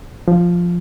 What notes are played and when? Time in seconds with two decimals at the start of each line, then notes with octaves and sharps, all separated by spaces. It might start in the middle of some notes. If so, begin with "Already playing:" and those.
0.28 F3